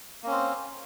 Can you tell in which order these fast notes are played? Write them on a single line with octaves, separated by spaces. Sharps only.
A#3 C#4 C4